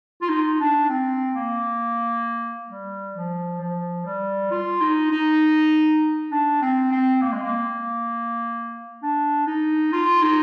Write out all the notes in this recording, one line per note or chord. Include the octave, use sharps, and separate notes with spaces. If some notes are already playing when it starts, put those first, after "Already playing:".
F4
D#4
D4
C4
A#3
G3
F3
F3
G3
F4
D#4
D#4
D4
C4
C4
A#3
G#3
A#3
D4
D#4
F4
D#4